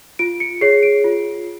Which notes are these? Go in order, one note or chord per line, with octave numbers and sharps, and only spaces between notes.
F4 D7
C#7
G#4 C#5 C7
D7
F4